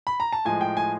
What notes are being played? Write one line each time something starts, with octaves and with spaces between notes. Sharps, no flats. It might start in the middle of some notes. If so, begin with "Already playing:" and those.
B5
A#5
A5
A2 F3 G#3 G#5
G5
G#5